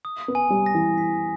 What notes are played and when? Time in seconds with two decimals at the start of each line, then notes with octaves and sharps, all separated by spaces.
0.05 D#6
0.28 B3
0.35 G#5
0.50 G3
0.66 A#6
0.75 E3
0.98 B6